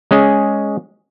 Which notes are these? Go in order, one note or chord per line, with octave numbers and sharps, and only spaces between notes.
G#3 C#4 G#4 G#5